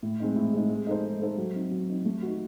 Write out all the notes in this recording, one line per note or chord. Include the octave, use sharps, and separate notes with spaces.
A2
G#3 C4 D#4
A2
G#3 C4 D#4
G#3
D#4 A4 C5
G#3
D#4 A4 C5
F#3
C4 D#4
F#3
C4 D#4
A3
D#4 F#4